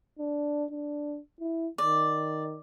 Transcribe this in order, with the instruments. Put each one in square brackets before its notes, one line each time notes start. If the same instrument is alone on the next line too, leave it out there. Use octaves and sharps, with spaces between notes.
[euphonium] D4
D4
E4
[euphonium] D#3 [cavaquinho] D5